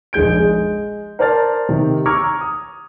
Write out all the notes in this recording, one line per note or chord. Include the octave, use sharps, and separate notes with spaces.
F1 A#1 G#3 G6 D7
G#3
A#4 C5 D5 A5 F6 A6
C3 D#3
A#5 C#6 D6 E6 F6 G#6
D#6